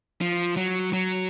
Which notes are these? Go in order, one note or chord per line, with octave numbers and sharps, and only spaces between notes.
F3
F#3
F#3